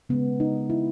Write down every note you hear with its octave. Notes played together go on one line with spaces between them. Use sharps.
C#3 G#3 B3
D#4
E4